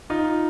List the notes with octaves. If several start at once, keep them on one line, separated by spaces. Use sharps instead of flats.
D#4 F4